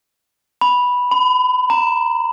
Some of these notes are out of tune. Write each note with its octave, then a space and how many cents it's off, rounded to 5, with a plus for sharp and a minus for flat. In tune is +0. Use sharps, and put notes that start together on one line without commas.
B5 -5
B5 +30
A#5 -10